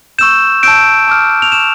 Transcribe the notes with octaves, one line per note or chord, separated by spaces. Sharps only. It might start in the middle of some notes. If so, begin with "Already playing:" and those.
C#6 E6 G6 E7
A5 E6 G6 D7
A5 D6 F6
F7
C#6 G6 E7